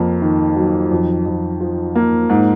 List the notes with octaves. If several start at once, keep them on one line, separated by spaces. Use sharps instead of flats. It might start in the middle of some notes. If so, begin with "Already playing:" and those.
Already playing: F2 A#3
D#3
F#3
F2
F2
F3
A#3
G#2